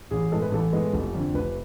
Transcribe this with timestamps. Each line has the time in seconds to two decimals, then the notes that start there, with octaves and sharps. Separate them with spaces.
0.11 A1 G#4
0.31 A2 G#3 B3 A4
0.42 B4
0.52 A1 A4
0.73 A2 G#3 B3
0.93 F1
1.14 F2 D3
1.34 F1 B4